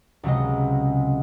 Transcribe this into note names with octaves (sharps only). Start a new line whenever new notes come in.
C#2 C3 F#3 G#3 D#5